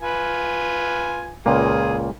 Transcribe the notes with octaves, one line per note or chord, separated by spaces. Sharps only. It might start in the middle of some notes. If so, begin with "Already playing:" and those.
F4 B4 G#5
C#2 A#2 A#3 F4 G#4